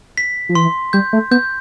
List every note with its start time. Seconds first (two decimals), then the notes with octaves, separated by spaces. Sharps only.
0.18 B6
0.49 F3
0.55 E3 C6
0.93 G3 G6
1.13 A3
1.31 B3 G6